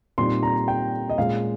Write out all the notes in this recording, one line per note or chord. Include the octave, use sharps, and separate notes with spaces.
A#2 G3 C4 D#4 C6
A#5
G5
D#5
A#2 G#3 C#4 F5